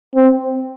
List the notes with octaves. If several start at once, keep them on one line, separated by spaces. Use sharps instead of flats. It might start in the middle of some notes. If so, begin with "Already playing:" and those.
C4